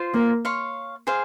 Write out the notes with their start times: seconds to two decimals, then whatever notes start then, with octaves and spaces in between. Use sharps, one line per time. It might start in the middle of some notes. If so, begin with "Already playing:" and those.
Already playing: F4 C5
0.14 A#3
0.45 C#5 F5 C6
1.07 G#4 C5 F5